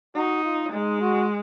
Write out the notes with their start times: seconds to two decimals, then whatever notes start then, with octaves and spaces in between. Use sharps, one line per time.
0.15 D#4 F#4
0.44 F4
0.72 G#3 D#4
1.01 F#4